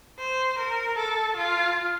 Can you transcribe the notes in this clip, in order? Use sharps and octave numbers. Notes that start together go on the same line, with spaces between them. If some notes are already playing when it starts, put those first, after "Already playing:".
C5
A#4
A4
F4